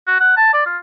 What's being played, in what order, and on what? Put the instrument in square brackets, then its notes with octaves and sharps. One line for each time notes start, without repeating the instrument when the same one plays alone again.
[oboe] F#4
F#5
A5
D5
F4